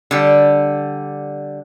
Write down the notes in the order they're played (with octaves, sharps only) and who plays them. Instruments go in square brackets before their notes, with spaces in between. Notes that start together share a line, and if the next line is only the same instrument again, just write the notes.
[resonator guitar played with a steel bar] D3 G3